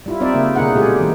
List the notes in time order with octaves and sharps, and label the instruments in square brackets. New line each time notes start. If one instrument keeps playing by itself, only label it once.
[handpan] G3 E4 F4
G3 C4 D#4 D5 E5
C#3 A#3
B2 D3 A#3 D#4 G#4 F#5
A#2 G#3 G4 G#4 D5
E3